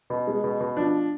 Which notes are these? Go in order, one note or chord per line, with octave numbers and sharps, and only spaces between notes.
B2
G#3
B2
B2
F3 D4